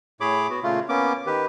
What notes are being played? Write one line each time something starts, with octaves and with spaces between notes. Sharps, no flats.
A2 G#4 C#5 B5 D6
B3 F#4
A#2 C#3 A3 F4
A#3 B3 C#4 D6
D#3 G4 B4